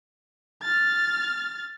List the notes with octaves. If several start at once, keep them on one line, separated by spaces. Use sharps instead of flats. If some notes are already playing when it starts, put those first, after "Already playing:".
F6 A6